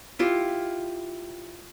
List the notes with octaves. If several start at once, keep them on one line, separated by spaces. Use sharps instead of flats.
E4 F4 G4